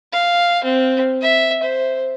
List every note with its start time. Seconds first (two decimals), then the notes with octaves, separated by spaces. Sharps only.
0.12 F5
0.64 C4
1.21 E5
1.63 C5